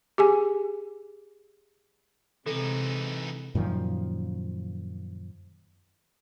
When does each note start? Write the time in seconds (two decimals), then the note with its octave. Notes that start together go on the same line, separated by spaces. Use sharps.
0.18 G4 G#4 G#5
2.46 C3 E3 G#3 C4 D#4 A4
3.55 F#2 A#2 D#3 F3